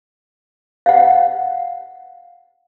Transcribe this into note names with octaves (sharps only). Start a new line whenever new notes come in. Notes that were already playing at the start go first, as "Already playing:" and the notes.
F5 F#5